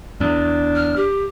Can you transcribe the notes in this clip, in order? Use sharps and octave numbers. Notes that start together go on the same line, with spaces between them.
E2 D4
F6
G4